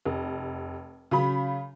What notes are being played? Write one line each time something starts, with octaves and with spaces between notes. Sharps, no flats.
F1
C#3 F#3 B5